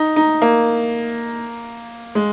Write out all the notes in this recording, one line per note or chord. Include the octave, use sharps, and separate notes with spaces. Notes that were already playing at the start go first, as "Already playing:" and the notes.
Already playing: D#4
D#4
A#3
G#3